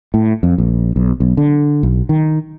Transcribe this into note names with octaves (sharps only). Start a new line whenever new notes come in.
A2
F2
A#1
B1
B1
D3
B1
D#3